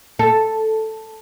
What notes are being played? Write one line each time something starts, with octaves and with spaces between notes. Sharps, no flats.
A4